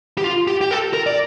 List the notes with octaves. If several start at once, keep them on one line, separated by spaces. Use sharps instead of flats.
G4
F4
G4
G4
A4
A#4
D5